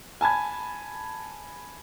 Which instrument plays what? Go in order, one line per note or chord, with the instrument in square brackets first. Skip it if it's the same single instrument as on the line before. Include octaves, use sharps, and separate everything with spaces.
[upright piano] G#5 A5 B5 G#6